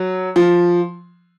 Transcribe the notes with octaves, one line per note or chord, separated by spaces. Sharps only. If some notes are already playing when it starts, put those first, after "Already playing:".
Already playing: F#3
F3